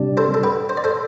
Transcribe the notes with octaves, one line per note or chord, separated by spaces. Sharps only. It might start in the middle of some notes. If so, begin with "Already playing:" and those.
Already playing: C3 G3 D4
A4 C5
A4
G4 B4
C5
D5
A4 C5